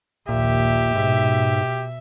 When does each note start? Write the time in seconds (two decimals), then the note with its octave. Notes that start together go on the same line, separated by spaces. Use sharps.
0.29 A#1 D#2 A#2 G4 E5
0.95 G#2 B2